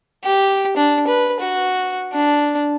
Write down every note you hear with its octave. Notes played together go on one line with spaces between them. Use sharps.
G4
D4
B4
F#4
D4